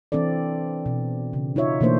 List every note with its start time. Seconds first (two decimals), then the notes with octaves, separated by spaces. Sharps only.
0.12 E3 C4 D4 A4 D5
0.86 B2
1.33 C#3
1.56 D#4 F4 C#5 E5
1.80 B2 E3 A3 A#3 D4 C5